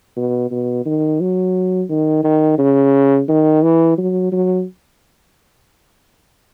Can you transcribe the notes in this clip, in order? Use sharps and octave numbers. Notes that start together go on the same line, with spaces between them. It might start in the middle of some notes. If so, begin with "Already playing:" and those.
B2
B2
D#3
F#3
D#3
D#3
C#3
D#3
E3
F#3
F#3